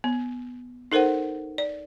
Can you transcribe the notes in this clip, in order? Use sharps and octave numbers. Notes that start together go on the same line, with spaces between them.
B3
D#4 A4 A#4 C5 F#5
D5